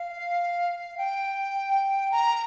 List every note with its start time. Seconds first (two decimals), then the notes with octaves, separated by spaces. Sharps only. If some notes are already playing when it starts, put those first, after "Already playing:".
Already playing: F5
0.98 G5
2.11 A#5